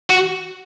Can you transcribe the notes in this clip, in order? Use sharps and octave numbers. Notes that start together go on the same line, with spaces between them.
F#4